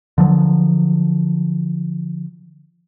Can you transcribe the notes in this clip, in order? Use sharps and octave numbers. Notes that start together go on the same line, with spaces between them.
D3 F3 F#3